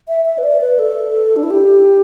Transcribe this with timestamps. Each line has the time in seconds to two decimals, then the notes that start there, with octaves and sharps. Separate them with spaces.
0.08 E5
0.25 E5
0.38 B4
0.43 D5
0.61 B4
0.79 A4
1.36 D4
1.43 E4
1.51 G4